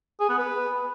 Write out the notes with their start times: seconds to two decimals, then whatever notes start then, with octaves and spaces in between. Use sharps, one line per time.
0.20 G#4
0.29 B3
0.38 B4